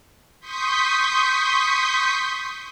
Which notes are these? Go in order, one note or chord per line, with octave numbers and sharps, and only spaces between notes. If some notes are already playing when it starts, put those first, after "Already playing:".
C6 C#6 D#6 G6 B6